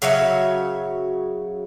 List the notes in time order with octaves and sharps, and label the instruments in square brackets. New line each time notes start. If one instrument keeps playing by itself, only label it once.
[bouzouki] C#3 F#3 C#5 E5